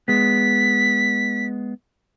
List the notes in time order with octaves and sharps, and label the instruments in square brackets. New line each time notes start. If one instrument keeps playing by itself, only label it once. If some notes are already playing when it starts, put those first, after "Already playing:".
[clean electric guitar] G#3 B3 [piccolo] B6